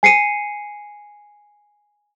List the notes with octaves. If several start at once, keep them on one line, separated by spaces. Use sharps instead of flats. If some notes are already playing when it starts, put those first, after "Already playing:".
G#5 C7 C#7 D#7